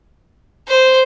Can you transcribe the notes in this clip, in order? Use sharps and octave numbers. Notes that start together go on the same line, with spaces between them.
C5